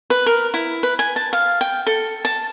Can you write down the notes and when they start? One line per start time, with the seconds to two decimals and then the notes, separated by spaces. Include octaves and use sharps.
0.10 B4
0.26 A#4
0.54 E4
0.83 B4
0.99 G#5
1.16 A5
1.33 F5
1.61 G5
1.87 A4
2.25 A5